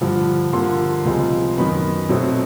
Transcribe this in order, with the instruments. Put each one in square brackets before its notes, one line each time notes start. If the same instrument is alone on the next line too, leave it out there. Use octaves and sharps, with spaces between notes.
[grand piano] G2 D3 F3
G2 D3 F3 A#3 C6
C#2 C3 F3 G#3
F#2 D#3 F#3 B3 B5
B2 F#3 A3 C4